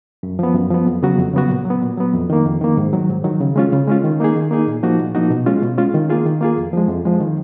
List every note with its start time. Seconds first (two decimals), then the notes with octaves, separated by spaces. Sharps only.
0.23 F#2
0.39 F3 B3
0.55 F#2
0.71 F3 B3
0.86 F2
1.03 C#3 F#3 B3 F#4
1.19 F2
1.34 C#3 F#3 B3 F#4
1.50 A#2
1.65 F#3 B3
1.81 A#2
1.98 F#3 B3
2.13 F2
2.30 D#3 A#3
2.45 F2
2.61 D#3 A#3
2.77 G#2
2.93 D#3 F#3
3.09 G#2
3.24 D#3 F#3
3.40 C#3
3.56 G#3 C#4 F4
3.72 C#3
3.87 G#3 C#4 F4
4.03 D#3
4.20 A#3 D#4 G#4
4.36 D#3
4.51 A#3 D#4 G#4
4.67 A#2
4.83 F3 A#3 D#4 F#4
4.99 A#2
5.15 F3 A#3 D#4 F#4
5.30 B2
5.46 G#3 C#4 F4
5.62 B2
5.78 G#3 C#4 F4
5.94 D#3
6.09 A#3 F4 G#4
6.25 D#3
6.41 A#3 F4 G#4
6.57 F2
6.73 F3 G#3
6.88 F2
7.05 F3 G#3
7.20 D#3